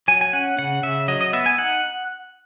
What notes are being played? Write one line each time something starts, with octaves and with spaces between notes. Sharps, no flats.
F#3 G#5
G#5
C#4 F#5
C#3 F#5
C#3 E5
F#3 D#5
D#5
B3 E5
G#5
D#4 F#5